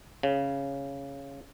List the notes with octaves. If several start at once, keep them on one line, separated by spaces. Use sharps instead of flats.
C#3